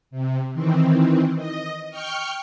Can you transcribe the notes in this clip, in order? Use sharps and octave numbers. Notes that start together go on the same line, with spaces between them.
C3
D#3 E3 C4
D#5
G5 C#6 F6 G6